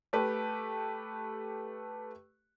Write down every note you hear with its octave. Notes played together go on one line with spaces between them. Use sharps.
A3 G4 B4